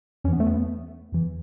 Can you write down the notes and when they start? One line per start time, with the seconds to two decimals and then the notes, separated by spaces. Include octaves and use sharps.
0.24 E2 C#4
0.28 E3 B3
0.40 A3
0.47 B3
1.12 E2 E3